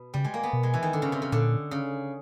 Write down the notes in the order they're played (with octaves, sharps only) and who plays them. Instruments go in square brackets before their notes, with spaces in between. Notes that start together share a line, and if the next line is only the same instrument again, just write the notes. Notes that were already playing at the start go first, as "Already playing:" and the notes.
Already playing: [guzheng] B2
[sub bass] C#3 [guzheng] G3
[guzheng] G#3
A#3
B3
[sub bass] B2
[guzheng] G#3
E3
D#3
D3
C#3
C3
C#3
[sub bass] A#2 [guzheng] D3
[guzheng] C#3